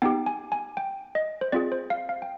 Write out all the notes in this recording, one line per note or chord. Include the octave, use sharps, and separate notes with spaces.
B3 D#4 G4 G5
G#5
G#5
G5
D#5
C5
C4 F4 G#4 D5
C5
F5
F5
G5